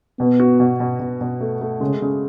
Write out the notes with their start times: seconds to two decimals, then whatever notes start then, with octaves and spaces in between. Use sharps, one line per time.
0.20 B2 B3
0.40 F#4
0.60 B2
0.80 B2
1.00 B2
1.21 B2
1.41 A3
1.61 A3
1.81 C#3 G#3
2.02 C#3